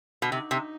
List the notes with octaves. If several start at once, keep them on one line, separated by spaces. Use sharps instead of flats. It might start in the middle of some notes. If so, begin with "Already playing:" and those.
B2
C3 D#4
C3